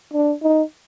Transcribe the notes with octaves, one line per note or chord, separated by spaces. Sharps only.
D4
D#4